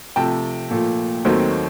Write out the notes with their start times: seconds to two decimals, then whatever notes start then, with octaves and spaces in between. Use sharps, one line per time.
0.16 C3 F3 A3 G5 A5
0.71 A#2 F3 A3
1.25 D#2 D#3 F#3 A3 C4